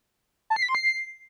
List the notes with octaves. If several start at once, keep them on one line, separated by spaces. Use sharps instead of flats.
A5
C7
B6
C6
C7